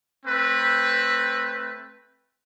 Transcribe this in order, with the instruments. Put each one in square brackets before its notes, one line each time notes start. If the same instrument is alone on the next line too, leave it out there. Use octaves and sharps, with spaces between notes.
[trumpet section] A3 C4 B4